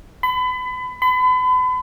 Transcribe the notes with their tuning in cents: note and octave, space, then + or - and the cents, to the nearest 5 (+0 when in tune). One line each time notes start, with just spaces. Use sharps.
B5 +30
B5 +40